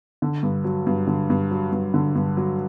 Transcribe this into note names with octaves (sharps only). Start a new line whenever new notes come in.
D3
G2
F#3
G2
D3
G2
F#3
G2
D3
G2
F#3